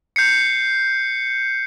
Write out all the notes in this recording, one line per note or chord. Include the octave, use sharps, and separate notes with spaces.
G6 C7 C#7